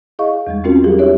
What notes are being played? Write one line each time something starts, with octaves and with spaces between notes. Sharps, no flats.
E4 G#4 D#5 F5 C#6
E2 G3 G#3
G#3 C4 C#4 F4 F#4 A#4
F#3 G3 G4 G#4
D4 E4 G4 C#5 E5